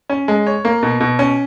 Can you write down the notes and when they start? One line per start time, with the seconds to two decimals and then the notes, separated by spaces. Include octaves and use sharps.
0.10 C#4
0.28 G#3
0.47 C#5
0.65 A#3
0.83 B2
1.00 B2
1.19 C#4